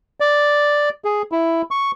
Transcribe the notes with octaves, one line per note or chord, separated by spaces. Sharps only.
D5
G#4
E4
C#6